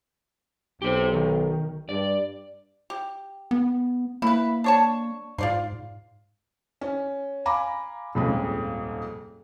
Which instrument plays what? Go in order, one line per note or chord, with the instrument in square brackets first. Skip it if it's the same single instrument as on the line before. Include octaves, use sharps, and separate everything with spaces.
[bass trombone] B1 [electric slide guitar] G4 C5
[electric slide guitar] D#3
[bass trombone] G2 [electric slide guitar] D5
[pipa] G4
[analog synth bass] B3
[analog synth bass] A#3 [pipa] E4 B4
[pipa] D4 C#5 A5
[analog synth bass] G#2 [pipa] F4 D5 C6
[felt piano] C#4
F5 G#5 A#5 B5 D6
D#1 F2 G#2 C#3